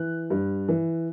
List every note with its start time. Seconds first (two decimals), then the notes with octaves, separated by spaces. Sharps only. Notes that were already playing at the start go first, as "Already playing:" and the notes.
Already playing: E3 F#6
0.30 G2
0.68 E3